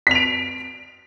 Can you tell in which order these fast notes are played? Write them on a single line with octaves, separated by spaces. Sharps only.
B6 F7 D7